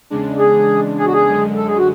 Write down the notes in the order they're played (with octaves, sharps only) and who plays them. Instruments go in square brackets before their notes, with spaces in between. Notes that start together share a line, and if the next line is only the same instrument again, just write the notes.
[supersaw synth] E2 C#3 G#3 D4
[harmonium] G#4
G#4
F#4
G#4
[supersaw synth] F#2 D3 G#3
[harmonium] A4
G#4
F#4